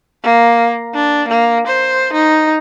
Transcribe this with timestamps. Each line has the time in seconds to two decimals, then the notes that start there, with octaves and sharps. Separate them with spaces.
0.24 A#3
0.94 D4
1.28 A#3
1.67 C5
2.13 D#4